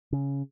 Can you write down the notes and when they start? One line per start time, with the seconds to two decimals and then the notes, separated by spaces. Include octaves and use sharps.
0.12 C#3